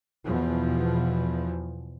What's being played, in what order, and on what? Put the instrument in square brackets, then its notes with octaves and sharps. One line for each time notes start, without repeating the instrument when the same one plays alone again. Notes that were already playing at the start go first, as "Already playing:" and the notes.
[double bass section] E2 B2 F3